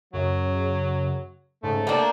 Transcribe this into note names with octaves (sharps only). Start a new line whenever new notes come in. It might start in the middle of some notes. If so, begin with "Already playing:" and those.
F#2 C#3 F#3
G#2 C#3 A3
A#3 D4 G5 A5